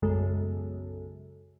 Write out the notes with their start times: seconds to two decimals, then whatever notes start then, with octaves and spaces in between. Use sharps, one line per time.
0.02 B1 F#2 C#3 G#3 A4